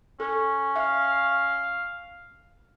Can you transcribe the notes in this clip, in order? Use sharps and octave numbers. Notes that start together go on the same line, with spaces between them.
C#4 A4
E5 F5